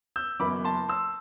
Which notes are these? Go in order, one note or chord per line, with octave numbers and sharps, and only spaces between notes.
E6 G6
F#1 F#2 E3 B3 E4 B5 D6
A5 C6
C6 E6